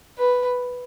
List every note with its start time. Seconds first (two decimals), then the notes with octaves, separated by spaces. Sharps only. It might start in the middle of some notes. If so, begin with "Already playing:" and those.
0.18 B4